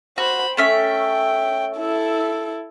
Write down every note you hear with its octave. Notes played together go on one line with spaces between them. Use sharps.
F#4 C5 B5
A3 C#4 E5 G5
E4 A4